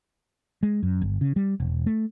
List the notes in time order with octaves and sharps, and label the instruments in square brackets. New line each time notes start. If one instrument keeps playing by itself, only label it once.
[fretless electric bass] G#3
F#2
G1
C#3
G3
E1
A3